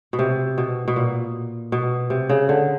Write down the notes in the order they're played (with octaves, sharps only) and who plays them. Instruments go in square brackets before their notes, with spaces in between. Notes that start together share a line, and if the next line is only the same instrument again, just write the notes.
[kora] B2
C3
B2
B2
A#2
B2
C3
C#3
D3